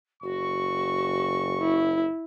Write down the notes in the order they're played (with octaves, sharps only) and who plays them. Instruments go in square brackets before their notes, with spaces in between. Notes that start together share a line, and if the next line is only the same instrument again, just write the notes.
[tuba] F#1 [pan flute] F#4 [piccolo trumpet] C#6
[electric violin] E4